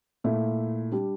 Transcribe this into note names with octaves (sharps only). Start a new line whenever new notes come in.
A#2 A3 E4
G3 D4 G4